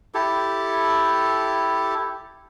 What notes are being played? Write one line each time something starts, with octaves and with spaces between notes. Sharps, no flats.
E4 G4 A4